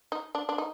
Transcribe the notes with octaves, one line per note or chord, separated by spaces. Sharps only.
D#4
D4
D4
D#4